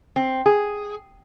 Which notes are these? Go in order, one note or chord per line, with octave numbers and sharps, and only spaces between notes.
C4
G#4